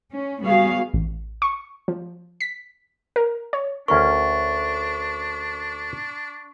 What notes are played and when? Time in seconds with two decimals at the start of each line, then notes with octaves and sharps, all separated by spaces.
0.13 C#4
0.43 G3 B3 F#4 G#4 F5
0.93 A1
1.42 C#6
1.88 F3
2.41 B6
3.16 A#4
3.53 C#5
3.88 D2 C#4 D4 A#4 C#6